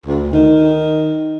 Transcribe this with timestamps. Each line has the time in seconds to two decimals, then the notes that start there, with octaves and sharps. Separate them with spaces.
0.06 D2
0.33 D#3 D#4